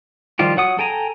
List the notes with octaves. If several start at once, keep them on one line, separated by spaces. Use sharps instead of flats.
D#3 F3 G3 F4 G4
F#3 F#5 D#6
A4 G5 G#5 A#5